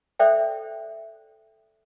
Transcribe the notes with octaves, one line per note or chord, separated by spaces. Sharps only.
A4 C5 D5 E5 G5